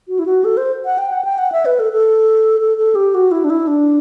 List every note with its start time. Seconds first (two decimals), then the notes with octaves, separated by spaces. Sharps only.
0.08 F#4
0.19 E4
0.26 F#4
0.45 A4
0.57 C5
0.85 F#5
0.98 G5
1.12 F#5
1.25 G5
1.38 F#5
1.52 E5
1.66 B4
1.80 A4
1.93 A4
2.61 A4
2.78 A4
2.95 G4
3.14 F#4
3.31 E4
3.44 D4
3.50 E4
3.67 D4